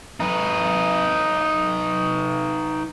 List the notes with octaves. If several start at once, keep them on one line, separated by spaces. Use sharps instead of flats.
D#4 B4